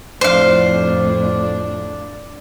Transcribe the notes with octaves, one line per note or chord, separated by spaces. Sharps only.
F2 A2 D4 C5 F5